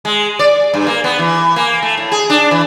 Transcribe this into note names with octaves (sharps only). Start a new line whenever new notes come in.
G#3
D5
G2
A#3
B3
E3
A#3
A3
A2
G#4
D4
E3